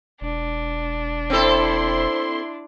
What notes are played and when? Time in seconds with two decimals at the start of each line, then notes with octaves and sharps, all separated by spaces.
0.21 E1 D4
1.30 C4 E4 A4 C6